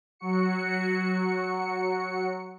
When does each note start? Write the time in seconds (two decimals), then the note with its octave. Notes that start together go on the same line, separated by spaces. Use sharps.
0.19 F#3 F#4 C#7